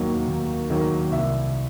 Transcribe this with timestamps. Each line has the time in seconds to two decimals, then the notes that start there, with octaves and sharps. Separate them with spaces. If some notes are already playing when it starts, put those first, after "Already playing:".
Already playing: D#2 D#3 F#3 A#3
0.27 D#2
0.70 D#3 F#3 A#3
1.11 C2 E5